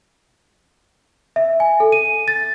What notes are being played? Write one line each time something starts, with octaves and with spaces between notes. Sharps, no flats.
E5
G#5
A4
D#7
A6